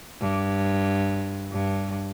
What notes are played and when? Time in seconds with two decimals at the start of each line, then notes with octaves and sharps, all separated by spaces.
0.21 G2
1.52 G2